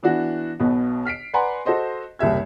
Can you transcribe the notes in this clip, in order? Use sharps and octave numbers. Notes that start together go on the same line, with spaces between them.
E3 B3 D4 E4 F#4
B1 B2 B3
F6 B6 C7 D7
B4 D5 F#5 G#5 A#5 C6
F#4 A4 C5 D#5 C6
F#1 C2 G3 E5 G#6